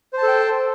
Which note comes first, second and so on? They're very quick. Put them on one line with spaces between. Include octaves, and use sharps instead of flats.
C5 A5 A4 G5